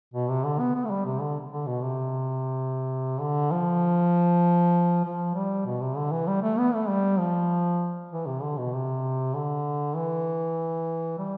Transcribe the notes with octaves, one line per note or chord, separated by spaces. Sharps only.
B2
C3
D3
B3
B3
A3
G3
C3
D3
D3
B2
C3
D3
F3
F3
G3
B2
C3
D3
E3
G3
A3
B3
A3
G3
F3
E3
C3
D3
B2
C3
D3
E3
G3